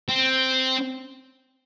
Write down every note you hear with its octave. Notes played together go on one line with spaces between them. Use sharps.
C4